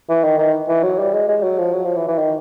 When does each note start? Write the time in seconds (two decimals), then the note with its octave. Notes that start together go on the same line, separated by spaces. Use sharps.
0.09 E3
0.24 D#3
0.38 D#3
0.69 E3
0.83 F#3
0.99 G3
1.14 G#3
1.29 G#3
1.43 F#3
1.59 F3
1.73 F#3
1.85 F3
1.96 E3
2.08 E3
2.18 D#3